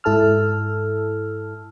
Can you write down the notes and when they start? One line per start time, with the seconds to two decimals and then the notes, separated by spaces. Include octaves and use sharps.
0.04 G#2 E4 A4 A5 E6 F6